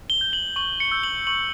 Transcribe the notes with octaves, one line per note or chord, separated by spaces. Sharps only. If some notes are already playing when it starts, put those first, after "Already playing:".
G7
G6
F#7
C#6 F#7
C#7
E6 G6
F#7
C#6 F#7